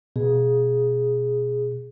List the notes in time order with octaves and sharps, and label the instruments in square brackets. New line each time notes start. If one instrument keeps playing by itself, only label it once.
[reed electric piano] B2 [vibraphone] G#4